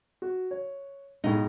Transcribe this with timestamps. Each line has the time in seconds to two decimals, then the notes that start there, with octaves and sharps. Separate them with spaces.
0.22 F#4
0.51 C#5
1.24 B1 A2 G#3 D#4